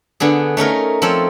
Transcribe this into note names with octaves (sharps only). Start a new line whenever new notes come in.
D3 B3 D4 G#4
A3 C#4 D#4 A#4
F3 C4 A4 C#5